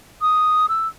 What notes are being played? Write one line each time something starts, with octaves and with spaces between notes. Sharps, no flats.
D#6
E6